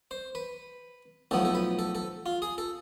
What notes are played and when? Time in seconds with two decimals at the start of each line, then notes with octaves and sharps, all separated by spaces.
0.11 C5
0.35 B4
1.31 B1 A2 F3 B3 A4
1.45 A4
1.55 B4
1.79 A4
1.95 A4
2.26 F4
2.42 G#4
2.58 A4